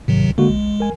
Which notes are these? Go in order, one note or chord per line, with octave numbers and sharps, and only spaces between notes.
A1 G#2 C3 D#3 F#3
C#2
D3 G#3 A#3 F#4
B1
A#4 G#5